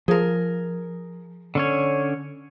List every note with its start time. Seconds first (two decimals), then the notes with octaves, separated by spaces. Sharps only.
0.08 F3 G#4 A#4
1.55 D3 C#4 C#5